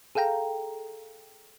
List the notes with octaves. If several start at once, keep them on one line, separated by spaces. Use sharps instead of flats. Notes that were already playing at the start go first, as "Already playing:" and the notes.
G#4 A4 F5 G5 A#5